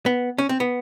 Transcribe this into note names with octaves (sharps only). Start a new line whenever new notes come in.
B3
C#4
C4
B3